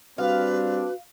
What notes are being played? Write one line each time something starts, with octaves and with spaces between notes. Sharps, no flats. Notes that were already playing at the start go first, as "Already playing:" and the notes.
G3 C4 D4 F#4 B4 F5